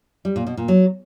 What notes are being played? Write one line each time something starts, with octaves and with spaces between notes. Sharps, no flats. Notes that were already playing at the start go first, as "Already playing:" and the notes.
G3
A#2
B2
A#2
F#3